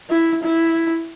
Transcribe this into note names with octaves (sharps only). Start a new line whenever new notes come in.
E4
E4